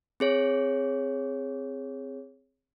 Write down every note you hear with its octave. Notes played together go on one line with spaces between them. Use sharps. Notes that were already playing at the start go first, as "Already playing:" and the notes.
C4 G#4 C#5